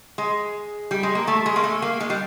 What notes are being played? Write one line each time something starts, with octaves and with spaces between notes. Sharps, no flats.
G#3
G3
G#3
A#3
A3
G#3
A#3
A3
A#3
G#3
G3